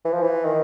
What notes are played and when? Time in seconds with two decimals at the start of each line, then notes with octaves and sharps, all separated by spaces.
0.05 E3
0.13 F3
0.22 E3
0.44 D#3